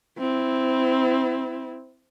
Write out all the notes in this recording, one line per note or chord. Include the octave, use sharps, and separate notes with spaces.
C4 E4